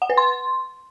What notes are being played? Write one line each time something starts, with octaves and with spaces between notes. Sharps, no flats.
F#5
B4
C6